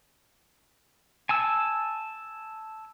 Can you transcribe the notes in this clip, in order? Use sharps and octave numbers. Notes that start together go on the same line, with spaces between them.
G#5 A5 E6